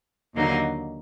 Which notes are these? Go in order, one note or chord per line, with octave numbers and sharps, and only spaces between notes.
D#2 D3 F#3 A#3 D#4